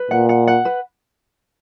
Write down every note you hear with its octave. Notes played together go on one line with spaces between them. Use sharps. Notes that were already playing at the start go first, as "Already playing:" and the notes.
Already playing: B4
A#2 F#5
F#5
F#5
B4